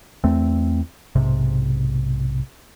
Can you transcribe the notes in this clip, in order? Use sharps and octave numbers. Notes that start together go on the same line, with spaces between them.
E2 A3 C4
B1 G#2 C3